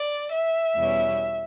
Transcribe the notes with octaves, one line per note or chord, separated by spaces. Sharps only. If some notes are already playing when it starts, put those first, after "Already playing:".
Already playing: D5
E5
E2 B2 G3 C#4